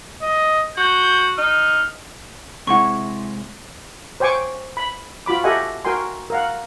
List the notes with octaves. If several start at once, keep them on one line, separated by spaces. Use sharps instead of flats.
D#5
F#4 G6
D#4 F6
C3 G#3 E4 F#5 C#6
C5 C#5 G5 G#5 C#6 D6
B5
F4 F#4 B5 D6
G4 A4 D#5 E5 F#5 G#5
F#4 A#4 G5 G#5 C6
A#4 F5 F#5